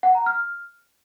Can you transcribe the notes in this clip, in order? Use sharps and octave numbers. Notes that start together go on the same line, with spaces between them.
F#5
A#5
F6